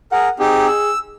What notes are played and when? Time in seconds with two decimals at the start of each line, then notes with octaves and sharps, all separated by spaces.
0.12 G#4 A#4 F#5
0.40 C4 D#4 G4 G#4
0.68 E6